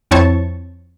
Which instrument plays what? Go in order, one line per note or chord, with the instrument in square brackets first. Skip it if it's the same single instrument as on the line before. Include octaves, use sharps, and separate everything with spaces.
[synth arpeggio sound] F2 C4 E4 C#5 A5 C#6